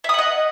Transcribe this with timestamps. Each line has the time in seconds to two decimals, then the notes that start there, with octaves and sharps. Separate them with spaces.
0.04 E5
0.09 D#6
0.14 F#5
0.19 D#5